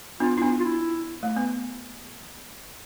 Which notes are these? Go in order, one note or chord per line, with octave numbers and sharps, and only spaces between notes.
B3 D4 F4
E4
B3 D4
F4
E4
A3
B3